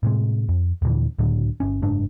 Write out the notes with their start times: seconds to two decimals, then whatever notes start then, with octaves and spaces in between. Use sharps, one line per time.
0.03 A2 C3 G#3
0.49 F2
0.82 D#2 A#2 D3 E3
1.19 C#2 A2 D3 F#3
1.60 G1 C#4
1.82 F#1 G#2 D4